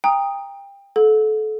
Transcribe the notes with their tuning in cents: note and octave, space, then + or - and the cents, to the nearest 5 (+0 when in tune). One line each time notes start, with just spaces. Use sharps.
G5 +25 A#5 +0 D#6 +0
A4 -30 F#5 -45